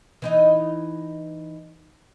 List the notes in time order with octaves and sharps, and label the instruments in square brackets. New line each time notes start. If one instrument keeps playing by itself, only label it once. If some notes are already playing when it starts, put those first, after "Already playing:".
[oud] E3 D#4 D#5